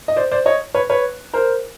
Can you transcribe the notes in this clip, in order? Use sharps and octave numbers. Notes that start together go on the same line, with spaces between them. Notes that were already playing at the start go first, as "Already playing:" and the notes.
D#5
C5 D5
C5 D5
C#5 D#5
B4 C#5
B4 C#5
A#4 C5